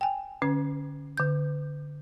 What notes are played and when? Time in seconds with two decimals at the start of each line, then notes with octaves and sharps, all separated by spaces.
0.01 G5 G#5
0.42 D3 C#4 B4
1.17 D3 G6